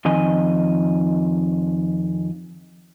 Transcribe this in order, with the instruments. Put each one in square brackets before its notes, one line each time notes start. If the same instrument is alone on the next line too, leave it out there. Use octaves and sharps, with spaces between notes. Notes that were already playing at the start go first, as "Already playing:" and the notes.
[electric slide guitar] F2 D#3 D#5 G#5